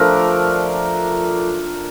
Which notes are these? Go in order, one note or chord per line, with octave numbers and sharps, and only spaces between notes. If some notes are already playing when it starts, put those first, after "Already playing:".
Already playing: F3 A3 D4 A#4